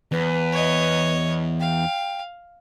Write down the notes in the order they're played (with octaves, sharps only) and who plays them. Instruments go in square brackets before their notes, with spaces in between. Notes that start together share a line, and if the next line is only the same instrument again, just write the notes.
[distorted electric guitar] E2 [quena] B4
[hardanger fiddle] C#5 D#5
[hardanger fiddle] F5 [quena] G5